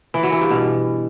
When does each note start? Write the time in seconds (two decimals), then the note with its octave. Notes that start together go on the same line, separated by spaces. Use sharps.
0.14 E3
0.23 F#3
0.32 E3
0.41 G2
0.51 B2